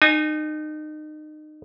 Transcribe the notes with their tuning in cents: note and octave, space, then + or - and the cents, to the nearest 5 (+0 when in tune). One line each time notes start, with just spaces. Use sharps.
D#4 -30 G#5 +0